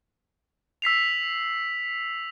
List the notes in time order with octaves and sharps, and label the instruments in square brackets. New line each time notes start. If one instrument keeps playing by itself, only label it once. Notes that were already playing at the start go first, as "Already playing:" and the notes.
[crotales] E6 B6 C7 F7